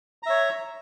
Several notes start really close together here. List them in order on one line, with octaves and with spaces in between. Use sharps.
A#5 E5 C#5